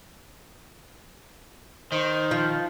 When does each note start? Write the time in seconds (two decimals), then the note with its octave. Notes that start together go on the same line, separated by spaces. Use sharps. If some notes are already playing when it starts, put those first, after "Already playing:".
1.92 D#3 D#4 C5
2.31 F3